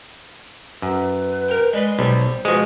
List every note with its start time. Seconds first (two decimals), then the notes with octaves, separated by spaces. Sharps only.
0.82 F#2 B4
1.49 A#4 G5
1.73 G#3 B4 D5 C6
1.99 B1 G3 C5
2.45 G#2 B2 F3 G#3